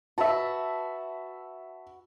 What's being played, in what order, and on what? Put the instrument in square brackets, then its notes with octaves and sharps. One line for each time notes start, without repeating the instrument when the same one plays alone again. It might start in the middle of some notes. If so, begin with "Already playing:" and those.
[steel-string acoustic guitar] F#4 B4 [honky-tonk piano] E5 A5